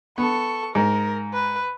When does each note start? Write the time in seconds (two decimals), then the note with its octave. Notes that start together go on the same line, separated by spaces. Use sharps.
0.18 B3 A4 C#6
0.75 G#2 A#4
1.33 B4